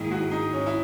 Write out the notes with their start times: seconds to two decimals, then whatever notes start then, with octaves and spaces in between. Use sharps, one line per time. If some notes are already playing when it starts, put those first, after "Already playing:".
Already playing: G#2 D#3 A#3 D#4 E4 G#4
0.11 F#4
0.31 D#4
0.53 C#4
0.66 E4